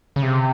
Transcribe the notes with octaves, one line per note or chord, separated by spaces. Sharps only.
C#3
C3